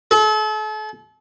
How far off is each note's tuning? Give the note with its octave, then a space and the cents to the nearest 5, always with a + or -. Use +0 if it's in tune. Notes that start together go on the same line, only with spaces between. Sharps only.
A4 -40